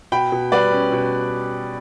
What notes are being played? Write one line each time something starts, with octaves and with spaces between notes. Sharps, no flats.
B2 G5 B5
B2
G3 B4 D5
C#4
B2